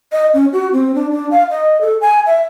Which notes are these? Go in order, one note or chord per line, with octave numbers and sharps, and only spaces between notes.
D#5
C#4
F#4
C4
D4
D4
F5
D#5
A4
G#5
E5